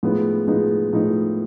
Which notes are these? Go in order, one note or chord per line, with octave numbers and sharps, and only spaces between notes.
A2 F3 G#3 B3 D#4
A2 F3 G#3 B3 D#4
A2 F3 G#3 B3 D#4